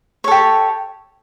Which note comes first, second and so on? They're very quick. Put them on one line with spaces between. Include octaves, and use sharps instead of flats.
C#5 A4 G4